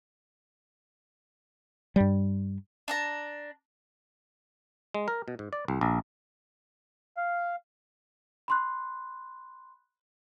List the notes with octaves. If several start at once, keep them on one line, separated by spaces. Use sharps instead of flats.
G2 G3
D4 A5 A#5
G#3
A#4
B2
G#2
D5
C2
A#1
F5
B5 C6 F#6